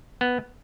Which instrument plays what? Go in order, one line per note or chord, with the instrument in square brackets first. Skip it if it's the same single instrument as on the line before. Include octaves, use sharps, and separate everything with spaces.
[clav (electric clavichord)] B3